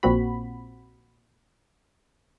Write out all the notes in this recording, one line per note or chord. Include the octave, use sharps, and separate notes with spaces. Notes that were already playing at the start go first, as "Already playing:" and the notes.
A#1 A#2 C4 F#4 B5